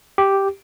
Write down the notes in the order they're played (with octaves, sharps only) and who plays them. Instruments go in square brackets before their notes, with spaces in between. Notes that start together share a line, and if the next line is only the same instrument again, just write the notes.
[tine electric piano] G4